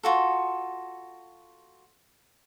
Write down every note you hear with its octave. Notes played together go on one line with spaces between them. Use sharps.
F4 F#4 A4